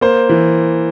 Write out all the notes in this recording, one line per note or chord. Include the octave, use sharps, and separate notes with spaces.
A#3 C5
E3